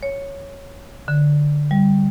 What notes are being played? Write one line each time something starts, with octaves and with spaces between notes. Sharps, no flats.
C#5
D3
G3